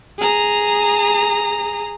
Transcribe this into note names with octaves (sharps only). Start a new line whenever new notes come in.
G#4 A#5